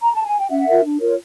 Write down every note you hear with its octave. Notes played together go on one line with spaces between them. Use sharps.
A#5
A5
G#5
G5
C#4 E5 F#5
F4 A#4
D4
F4 A#4 C#5